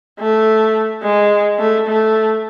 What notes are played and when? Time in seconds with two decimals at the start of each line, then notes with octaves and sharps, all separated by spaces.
0.19 A3
1.03 G#3
1.59 A3
1.87 A3